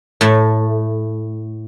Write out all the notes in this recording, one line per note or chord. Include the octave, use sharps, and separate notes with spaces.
A2 A3